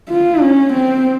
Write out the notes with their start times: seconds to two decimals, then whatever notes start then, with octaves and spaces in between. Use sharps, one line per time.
0.10 F4
0.41 C#4
0.73 C4